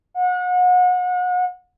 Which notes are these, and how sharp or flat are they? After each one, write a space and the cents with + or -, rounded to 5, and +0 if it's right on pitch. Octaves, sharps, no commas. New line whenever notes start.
F#5 -35